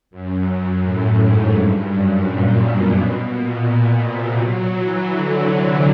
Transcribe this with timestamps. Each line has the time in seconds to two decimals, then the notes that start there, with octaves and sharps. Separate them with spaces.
0.11 F#2
0.46 F#2
0.82 A2
1.17 G#2
1.53 G2
1.89 F#2
2.24 A#2
2.60 B2
2.97 B2
3.32 A#2
3.68 A#2
4.04 C3
4.39 F#3
4.76 E3
5.10 D3
5.47 C3